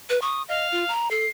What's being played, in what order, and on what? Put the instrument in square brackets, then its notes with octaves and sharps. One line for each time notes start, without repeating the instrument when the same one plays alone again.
[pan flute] B4
[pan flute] C#6 [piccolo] D#6
[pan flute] D#5 [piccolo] F5
[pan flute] F4
A#5
[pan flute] A4 [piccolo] C7